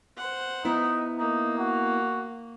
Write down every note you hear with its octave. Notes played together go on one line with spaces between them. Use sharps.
C5 F#5
B3 D#4 E4 E5
A#3 D#4
F#4